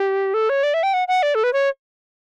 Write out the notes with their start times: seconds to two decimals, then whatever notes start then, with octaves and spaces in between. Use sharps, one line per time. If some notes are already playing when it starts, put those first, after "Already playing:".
Already playing: G4
0.34 A4
0.49 C#5
0.63 D5
0.74 E5
0.83 G5
0.94 F#5
1.08 F#5
1.23 D5
1.35 A4
1.44 B4
1.53 C#5